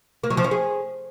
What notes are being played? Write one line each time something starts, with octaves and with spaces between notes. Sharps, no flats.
A#3
F#3
F3
C#4
G#4